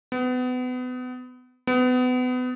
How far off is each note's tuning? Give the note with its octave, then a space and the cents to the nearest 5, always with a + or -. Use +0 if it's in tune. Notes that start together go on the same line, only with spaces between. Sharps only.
B3 +30
B3 +30